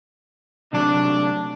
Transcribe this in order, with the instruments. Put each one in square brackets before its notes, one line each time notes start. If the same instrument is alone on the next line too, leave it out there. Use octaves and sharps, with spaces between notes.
[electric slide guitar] C3 F#3 A3 [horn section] D4